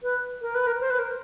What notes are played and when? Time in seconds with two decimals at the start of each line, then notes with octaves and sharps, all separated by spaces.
0.03 B4
0.42 A#4
0.55 B4
0.67 A#4
0.81 C5
0.90 B4
0.99 A#4